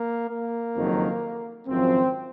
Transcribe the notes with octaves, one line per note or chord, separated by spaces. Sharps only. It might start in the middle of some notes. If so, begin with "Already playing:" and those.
Already playing: A#3
A#3
F#1 F2 D#3 F#3
G#1 F#2 F3 C4